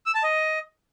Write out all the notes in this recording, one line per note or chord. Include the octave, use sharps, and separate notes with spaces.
E6
A5
D#5